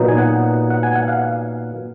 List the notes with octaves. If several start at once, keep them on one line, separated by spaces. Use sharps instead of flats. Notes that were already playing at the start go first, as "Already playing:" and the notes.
Already playing: A#2 F#3 B3 D#4
G#5
F#5
F#5
G#5
F#5
F5